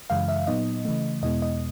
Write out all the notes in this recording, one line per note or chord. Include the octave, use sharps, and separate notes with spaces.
F#2 C#3 E3 G#3 F5
E5
A#2 F#3 B3 D#4 D#5
C#3 E3 A3
E2 B2 G#3 B3 E4 D#5
D#5